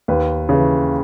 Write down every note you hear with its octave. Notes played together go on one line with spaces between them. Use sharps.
D#2 B4
C#3 E3